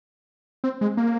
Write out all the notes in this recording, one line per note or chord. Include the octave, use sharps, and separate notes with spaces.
C4
G#3
A#3